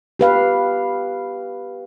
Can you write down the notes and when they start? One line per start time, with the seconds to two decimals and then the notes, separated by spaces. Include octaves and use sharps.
0.19 G4 B4 F5